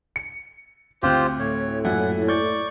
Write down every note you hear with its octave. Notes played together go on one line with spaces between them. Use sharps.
C#7
D2 C4 F4 G4 C5 F#6
A2 C#5
F#2 A#2 E4 F#5
D5 C#6 G6